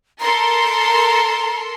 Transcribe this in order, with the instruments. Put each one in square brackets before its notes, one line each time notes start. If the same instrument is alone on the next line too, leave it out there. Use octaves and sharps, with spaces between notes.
[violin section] A4 A#4 C6 [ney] A#5